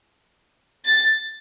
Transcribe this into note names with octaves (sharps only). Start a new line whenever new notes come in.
A6